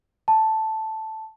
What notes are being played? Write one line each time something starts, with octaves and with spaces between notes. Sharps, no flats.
A5